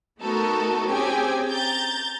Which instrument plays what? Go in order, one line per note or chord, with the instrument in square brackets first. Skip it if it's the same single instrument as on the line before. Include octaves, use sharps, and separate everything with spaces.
[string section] A3 B3 D#4 F#4 A4 A#4
C4 C#4 G4 G#4 G5 G#5
A#5 G6 A6